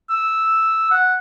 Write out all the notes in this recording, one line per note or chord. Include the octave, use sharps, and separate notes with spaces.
E6
F#5